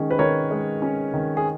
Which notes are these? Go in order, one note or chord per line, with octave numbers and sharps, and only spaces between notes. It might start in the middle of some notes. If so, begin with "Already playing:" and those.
Already playing: D#3 G#3 C#4
B4
D#3 A#4 C#5
G#3
C#4
D#3
G#4